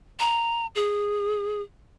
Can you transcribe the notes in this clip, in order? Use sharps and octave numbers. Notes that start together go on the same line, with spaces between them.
A#5
G#4